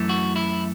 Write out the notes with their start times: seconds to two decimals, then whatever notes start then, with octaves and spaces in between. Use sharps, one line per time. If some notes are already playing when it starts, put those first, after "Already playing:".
Already playing: F#2 E3 A3
0.09 F#4
0.36 E4